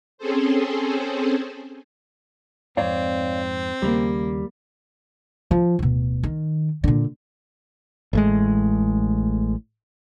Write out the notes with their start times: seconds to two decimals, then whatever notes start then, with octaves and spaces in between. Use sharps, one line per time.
0.18 C4 C#4 G#4 A4 C5
2.77 F2 G#2 C4 C#5 D5 F5
3.82 D#2 C#3 G3 A#3
5.51 F3
5.79 D1 B2
6.23 D#3
6.84 A#2 D3
8.13 A1 A2 G#3